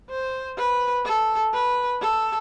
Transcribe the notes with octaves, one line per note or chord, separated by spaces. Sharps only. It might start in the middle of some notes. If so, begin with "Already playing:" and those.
C5
B4
A4
B4
A4